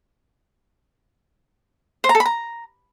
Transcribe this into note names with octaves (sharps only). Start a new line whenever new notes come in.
C5
A#5
A4
B5
A#5